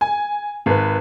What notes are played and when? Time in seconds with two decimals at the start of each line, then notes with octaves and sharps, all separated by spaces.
0.01 G#5
0.66 G#1 B4